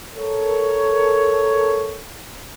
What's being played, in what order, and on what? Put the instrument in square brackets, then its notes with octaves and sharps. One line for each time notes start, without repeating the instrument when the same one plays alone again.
[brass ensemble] A4 A#4 C#5